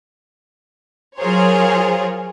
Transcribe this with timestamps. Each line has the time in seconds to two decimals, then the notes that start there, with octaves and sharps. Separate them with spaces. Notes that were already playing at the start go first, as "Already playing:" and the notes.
1.18 F#3 F4 G#4 A#4 C5 C#5